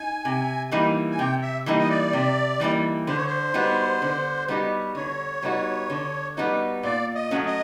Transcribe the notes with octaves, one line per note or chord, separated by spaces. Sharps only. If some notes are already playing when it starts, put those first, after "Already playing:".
Already playing: D#4 G#5
C3
E3 G3 A#3 D#4
G#5
C3 G5
E5
E3 G3 A#3 D#4
D#5
D5
C3
E3 G3 A#3 D#4
D3 C5
C#5
C5
G3 B3 D#4 F#4
D3
G3 B3 D#4 F#4
D3 C#5
G3 B3 D#4 F#4
D3
G3 B3 D#4 F#4
A#2 D5
D#5
F#3 A3 C#4 F#4
D#5